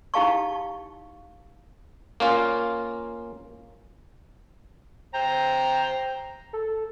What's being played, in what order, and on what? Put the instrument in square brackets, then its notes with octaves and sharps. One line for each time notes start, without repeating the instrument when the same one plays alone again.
[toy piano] D#4 E4 G4 F5 A5 C#6
[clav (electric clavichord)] A#3 C#4 F4
[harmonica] C5 G5 A#5
[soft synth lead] A4